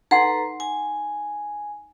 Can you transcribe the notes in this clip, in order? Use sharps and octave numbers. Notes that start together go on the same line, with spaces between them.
D#4 A4 B4 F#5 A#5 C6
G#5